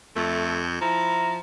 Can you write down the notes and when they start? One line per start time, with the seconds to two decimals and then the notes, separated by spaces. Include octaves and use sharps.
0.16 F2 A3 A4
0.81 F3 E4 A#5